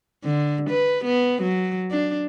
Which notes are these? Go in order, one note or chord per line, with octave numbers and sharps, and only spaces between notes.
D3
B4
B3
F#3
D4